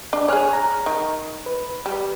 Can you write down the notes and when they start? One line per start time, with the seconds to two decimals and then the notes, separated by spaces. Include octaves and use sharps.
0.13 D4
0.28 G#4 C#5 G#5 F6 F#6
0.53 A#5
0.86 D#3
1.46 B4
1.86 G3